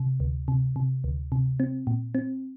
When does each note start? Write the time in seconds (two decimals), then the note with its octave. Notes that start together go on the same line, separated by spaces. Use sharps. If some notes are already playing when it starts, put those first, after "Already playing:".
Already playing: C3
0.20 D2
0.48 C3
0.76 C3
1.04 D2
1.32 C3
1.60 C4
1.87 A#2
2.15 C4